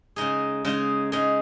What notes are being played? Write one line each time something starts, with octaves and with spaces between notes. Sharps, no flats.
C#3 G#3 D#4 G#4
C#3 G#3 D#4 G#4
C#3 G#3 D#4 G#4